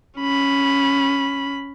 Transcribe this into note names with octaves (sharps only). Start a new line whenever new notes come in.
C#4 B5